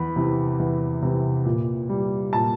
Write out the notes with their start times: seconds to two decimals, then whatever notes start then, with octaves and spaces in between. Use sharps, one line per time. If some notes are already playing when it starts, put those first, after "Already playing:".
Already playing: E2 B5
0.16 C3 E3
0.59 E2
1.02 C3 E3
1.45 A#2
1.89 G3
2.33 A#2 A5